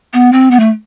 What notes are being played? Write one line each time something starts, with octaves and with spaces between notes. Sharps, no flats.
B3
C4
B3
A3